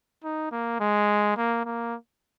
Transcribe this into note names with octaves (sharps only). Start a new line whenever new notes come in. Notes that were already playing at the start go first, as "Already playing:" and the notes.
D#4
A#3
G#3
A#3
A#3